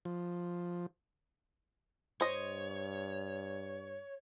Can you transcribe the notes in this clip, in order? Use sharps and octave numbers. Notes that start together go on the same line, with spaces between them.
F3
G2 C5 C#5 D#5